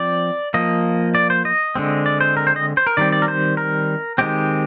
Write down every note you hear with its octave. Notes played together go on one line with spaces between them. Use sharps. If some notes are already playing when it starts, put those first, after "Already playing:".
Already playing: F3 C4 D5
F3 A#3 D#5
D5
C5
D#5
D3 G#3 C4
D5
C5
A#4
C5
D#5
C5
A#4
D#3 G3 C4 D5
D5
A#4
C5
A#4
D#3 G#3 C4 G4